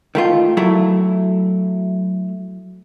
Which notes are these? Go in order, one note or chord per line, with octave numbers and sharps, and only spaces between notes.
D#3 A3 F4
F#3 A3 E4